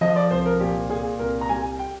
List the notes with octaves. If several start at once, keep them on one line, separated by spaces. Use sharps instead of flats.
F3 D#5
D5
C2 C5
A#4
A#2 G4
A#2 G#4
C2 A#4
A#5
G3 G#5
G5